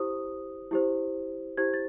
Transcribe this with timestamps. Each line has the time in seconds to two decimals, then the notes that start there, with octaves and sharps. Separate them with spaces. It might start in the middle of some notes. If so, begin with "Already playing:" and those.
Already playing: E4 G4 C5 D#6
0.71 E4 G4 C5
1.57 E4 G4 C5 G#6
1.74 A6